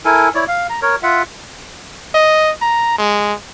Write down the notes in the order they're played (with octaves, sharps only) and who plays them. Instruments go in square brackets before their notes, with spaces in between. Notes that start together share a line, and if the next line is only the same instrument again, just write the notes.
[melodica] E4 A4 A#4 G#5
E4 C#5 D5
F5
A#5
A#4 C#5
F4 E5 F#5
[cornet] D#5
A#5
G#3